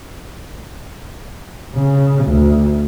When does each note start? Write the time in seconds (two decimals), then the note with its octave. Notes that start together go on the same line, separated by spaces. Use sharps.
1.75 C#3
2.25 D2